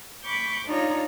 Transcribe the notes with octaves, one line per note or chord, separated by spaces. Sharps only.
B5 C#6 D6 G6
D4 D#4 F4 C#5 A#5